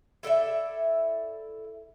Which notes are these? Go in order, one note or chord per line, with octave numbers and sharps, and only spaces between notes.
E4 A4 D5 E5